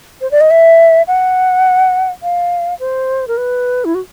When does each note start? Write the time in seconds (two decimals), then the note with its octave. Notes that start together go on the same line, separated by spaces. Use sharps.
0.21 C5
0.31 D5
0.41 D#5
0.51 E5
1.07 F#5
2.23 F5
2.80 C5
3.28 A#4
3.37 B4
3.85 E4
3.95 F#4